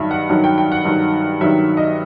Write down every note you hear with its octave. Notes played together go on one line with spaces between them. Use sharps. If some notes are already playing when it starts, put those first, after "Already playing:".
Already playing: G2 D#3 F#3 D#5 E5
F#5
G2 D#3 F#3 F#5
G5
G5
F#5
G2 D#3 F#3
G2 D#3 F#3 E5
D#5